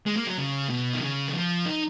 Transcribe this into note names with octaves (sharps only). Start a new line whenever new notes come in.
G#3
A#3
F#3
C#3
B2
D#3
C#3
D#3
F3
D#4